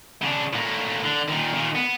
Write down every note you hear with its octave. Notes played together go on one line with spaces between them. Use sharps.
C#3 D4
A2 A#3
D3
A#2 D#3
A#2 D#3
B3